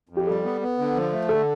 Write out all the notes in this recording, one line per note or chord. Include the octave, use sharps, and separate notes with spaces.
F2
G4
G3 A4
B3
B3
D3
F3
A3
D3 A4